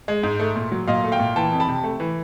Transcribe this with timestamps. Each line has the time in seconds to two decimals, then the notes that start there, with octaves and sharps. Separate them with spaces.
0.08 G#3
0.23 G#2
0.40 A3
0.56 A#2
0.72 F#3
0.88 A#2 D#5 F5
1.04 A3
1.12 F5 G5
1.20 A#2
1.36 E3 G5 A5
1.52 F2
1.60 A5 B5
1.68 C3
1.84 A3
2.00 E3